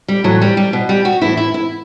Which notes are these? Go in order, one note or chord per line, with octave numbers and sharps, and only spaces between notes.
G3
A2 E3 F#3
G3
G3
B2
G3
F#4
A2 E3 E4
E4
E4